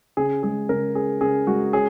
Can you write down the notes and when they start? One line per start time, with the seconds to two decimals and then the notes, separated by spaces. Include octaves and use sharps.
0.17 C#3 G#4
0.43 G#3 G#4
0.69 C#3 A#4
0.95 C#4 G#4
1.21 C#3 G#4
1.47 G#3 F#4
1.73 C#4 G#4